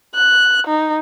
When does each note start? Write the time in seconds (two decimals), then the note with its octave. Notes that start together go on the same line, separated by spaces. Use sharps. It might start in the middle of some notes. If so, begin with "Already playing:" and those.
0.15 F#6
0.67 D#4